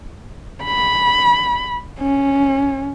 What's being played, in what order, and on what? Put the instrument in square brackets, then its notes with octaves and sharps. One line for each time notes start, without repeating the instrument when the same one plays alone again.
[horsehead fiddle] B5
C#4